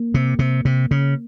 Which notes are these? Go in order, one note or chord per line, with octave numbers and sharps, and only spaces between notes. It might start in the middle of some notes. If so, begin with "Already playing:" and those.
Already playing: A#3
C3
C3
C3
C#3